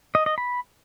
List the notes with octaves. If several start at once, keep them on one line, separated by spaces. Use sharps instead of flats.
D#5
D#5
B5